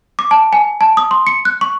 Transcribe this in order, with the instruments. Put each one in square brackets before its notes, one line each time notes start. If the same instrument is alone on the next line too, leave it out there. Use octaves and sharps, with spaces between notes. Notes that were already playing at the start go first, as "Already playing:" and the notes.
[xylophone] D6
A5
G#5
A5
D#6
C6
C#7
F#6
C#6